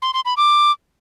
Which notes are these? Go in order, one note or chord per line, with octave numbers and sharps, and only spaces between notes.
C6
C6
B5
D6